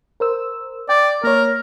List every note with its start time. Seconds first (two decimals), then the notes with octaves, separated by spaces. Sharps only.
0.20 A#4 C5 E6
0.89 D5 G5
1.24 A#3 A#4 C#5